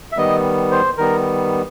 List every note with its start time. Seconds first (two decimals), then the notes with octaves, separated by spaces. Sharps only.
0.12 E5
0.17 D#3 G3 B3 D#5
0.72 C5
0.98 D#3 G3 B3 A#4